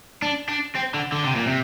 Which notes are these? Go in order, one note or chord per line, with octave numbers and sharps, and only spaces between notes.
D4
D4
C4
D3
D3
C3
A#2
C3